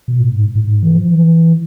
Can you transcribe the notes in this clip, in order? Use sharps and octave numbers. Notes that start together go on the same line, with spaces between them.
B2
A2
G#2
A2
G#2
E3
F3
E3